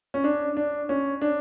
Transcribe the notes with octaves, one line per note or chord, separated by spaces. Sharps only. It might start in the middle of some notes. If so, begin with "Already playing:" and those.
C#4
D4
D4
C#4
D4